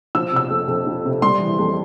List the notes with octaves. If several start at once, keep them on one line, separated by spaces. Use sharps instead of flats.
F3 E6
C3 E6
F2
F2
F3
C3
G3 C6
E3
F2